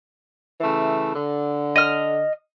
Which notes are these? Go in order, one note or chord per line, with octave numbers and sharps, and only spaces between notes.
C#3 E3 A3
D3
D#5 F6